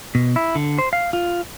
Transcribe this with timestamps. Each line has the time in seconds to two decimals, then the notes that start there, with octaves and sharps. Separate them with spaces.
0.15 B2
0.36 E4
0.55 D3
0.78 C5
0.93 F5
1.13 F4